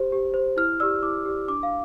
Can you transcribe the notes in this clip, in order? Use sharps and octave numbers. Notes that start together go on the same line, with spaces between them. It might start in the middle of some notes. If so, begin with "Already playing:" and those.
Already playing: G4 C5
G4
C5
E4 F6
G4 D5 E6
E4 D6
G4 D5
D4 D6
F5